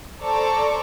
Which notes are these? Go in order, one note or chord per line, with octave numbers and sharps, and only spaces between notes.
A4 C5 D5 A#5 C#6 D6